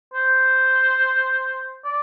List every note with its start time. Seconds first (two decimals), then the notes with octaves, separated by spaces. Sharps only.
0.14 C5
1.85 D5